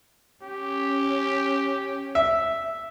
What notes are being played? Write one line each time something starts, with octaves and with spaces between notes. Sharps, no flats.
C#4 G4
E5